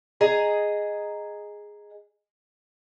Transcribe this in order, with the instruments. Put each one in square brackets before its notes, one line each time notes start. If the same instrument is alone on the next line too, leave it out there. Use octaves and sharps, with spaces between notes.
[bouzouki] G#4 D#5 A#5